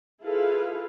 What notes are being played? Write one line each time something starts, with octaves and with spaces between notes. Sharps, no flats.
E4 F4 G#4 A4 B4 F5